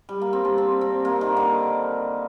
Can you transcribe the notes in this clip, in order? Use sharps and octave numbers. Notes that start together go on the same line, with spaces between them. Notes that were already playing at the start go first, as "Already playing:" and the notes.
G3
A#3
C4
D4
C4
C4
A#3
D#3
D3